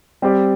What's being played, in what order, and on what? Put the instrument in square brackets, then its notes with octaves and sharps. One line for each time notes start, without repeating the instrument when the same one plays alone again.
[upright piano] G3 C4 G4 D5